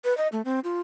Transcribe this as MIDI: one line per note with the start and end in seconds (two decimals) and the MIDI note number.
0.04 0.16 71
0.17 0.28 75
0.32 0.42 57
0.45 0.60 60
0.64 0.81 65